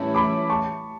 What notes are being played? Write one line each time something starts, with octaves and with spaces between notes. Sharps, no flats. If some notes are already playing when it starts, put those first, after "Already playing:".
Already playing: A2 E3 G3 C#4 E4 A5
B5 D6
A5 C#6